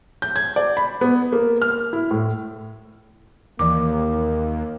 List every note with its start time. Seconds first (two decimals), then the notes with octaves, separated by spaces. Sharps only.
0.22 G6
0.36 G#6
0.56 D5
0.77 B5
1.01 B3
1.32 A#3
1.62 F6
1.93 E4
2.11 A2
3.59 D#2 E3 A#3 D6